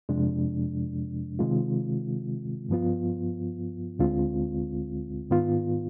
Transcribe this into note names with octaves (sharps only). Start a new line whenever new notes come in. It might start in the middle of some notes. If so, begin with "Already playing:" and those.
F2 C3 F3 G#3 D4
C3 D#3 G#3 C4 F4
G2 F3 B3 F4
D2 D3 G#3 C4 F4
G#2 D#3 B3 F4